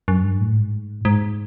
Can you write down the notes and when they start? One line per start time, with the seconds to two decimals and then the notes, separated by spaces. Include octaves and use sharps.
0.08 F#2
0.24 G2
0.41 A2
0.56 G#2
1.05 G#2